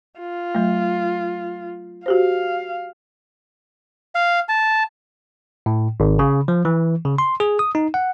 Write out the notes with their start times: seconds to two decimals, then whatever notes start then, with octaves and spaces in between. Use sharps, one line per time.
0.19 F4
0.55 F#3 A3
2.06 F#4 G4 C5 F5
4.15 F5
4.49 A5
5.66 A2
6.00 G#1
6.19 C#3
6.48 F3
6.65 E3
7.05 C#3
7.18 C6
7.40 G#4
7.59 D#6
7.75 D#4
7.94 F#5